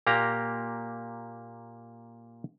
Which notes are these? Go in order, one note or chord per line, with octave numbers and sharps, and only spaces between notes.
A#2 A#3 G4 A#5